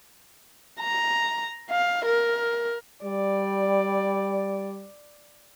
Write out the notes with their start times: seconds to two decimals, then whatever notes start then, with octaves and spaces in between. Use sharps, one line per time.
0.80 A#5
1.71 F5
2.05 A#4
3.04 G3 D5